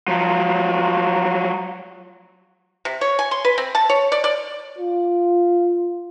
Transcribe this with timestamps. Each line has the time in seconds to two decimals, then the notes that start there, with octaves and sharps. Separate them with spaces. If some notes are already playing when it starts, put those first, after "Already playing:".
0.08 F3 F#3
2.85 C3
3.01 C#5
3.19 G#5
3.31 C6
3.45 B4
3.58 C4
3.75 A5
3.90 C#5
4.12 D5
4.24 D5
4.78 F4